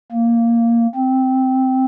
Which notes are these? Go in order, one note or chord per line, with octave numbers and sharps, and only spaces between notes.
A#3
C4